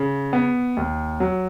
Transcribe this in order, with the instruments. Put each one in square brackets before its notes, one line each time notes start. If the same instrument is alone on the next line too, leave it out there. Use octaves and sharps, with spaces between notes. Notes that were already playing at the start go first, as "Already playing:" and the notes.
Already playing: [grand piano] C#3
B3
D#2
F#3